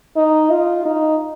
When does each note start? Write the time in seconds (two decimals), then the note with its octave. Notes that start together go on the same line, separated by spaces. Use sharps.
0.17 D#4
0.51 F4
0.85 D#4